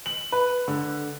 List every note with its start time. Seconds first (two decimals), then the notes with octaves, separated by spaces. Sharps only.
0.06 F#7
0.32 B4
0.68 D3